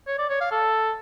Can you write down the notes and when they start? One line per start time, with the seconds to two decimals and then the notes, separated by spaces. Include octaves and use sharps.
0.07 C#5
0.18 D5
0.29 C#5
0.40 F5
0.51 A4